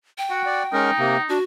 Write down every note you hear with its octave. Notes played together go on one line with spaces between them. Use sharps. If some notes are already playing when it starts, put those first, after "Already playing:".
G5
F#4 F#5
D5
G#3 C#4 D#4 A#4
C3 A#3
D4 F#4